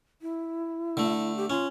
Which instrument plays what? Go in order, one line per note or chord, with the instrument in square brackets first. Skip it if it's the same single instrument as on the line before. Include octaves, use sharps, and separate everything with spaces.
[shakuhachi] E4
[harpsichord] D3 A3
[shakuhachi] G4
[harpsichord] C#4 [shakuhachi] F4